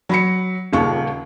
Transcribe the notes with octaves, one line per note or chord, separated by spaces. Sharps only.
F#3 B5 C#7
D#1 D#2 C#3 F4 C#6